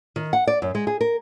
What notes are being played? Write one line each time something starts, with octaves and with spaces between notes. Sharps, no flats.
D#3
F#5
D5
F#2
G#3
G#4
A#4